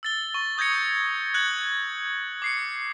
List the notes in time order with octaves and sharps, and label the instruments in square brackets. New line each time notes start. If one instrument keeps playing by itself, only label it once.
[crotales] E6 A6 G7
C#6
D#6 G6 G#6 A#6 C#7
F#6 G#6 C#7 F#7
D6 C7 C#7